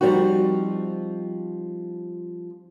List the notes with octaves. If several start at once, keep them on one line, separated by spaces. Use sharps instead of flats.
F3 G3 C4 D#4 F#4